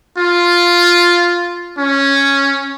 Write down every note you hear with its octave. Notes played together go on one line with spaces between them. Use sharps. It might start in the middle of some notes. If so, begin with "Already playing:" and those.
F4
C#4